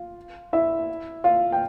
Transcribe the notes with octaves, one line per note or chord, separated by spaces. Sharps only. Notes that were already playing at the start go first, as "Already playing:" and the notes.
Already playing: F4
E4 E5
F4 F5
G5